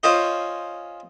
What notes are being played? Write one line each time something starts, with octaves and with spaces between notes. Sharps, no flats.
C#4 F4 C5 D#5